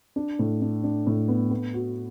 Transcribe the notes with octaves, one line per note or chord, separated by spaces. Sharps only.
D4
A2
D4
D4
A2
B3
B3
F#4